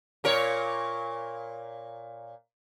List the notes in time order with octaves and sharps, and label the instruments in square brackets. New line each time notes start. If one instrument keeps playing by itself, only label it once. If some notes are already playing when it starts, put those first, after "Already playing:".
[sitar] A#2 A#4 C#5